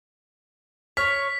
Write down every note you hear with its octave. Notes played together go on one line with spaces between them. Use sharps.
C#5 F6 B6